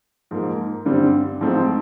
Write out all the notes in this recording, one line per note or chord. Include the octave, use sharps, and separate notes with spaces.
G#2 F3 A#3
G2 D3 G3 C4
G#2 F3 A3 C4